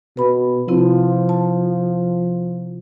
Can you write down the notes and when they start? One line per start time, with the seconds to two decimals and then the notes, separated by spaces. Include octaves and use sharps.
0.17 B2 B4 B5
0.68 C3 F3 C4 E4
1.29 A5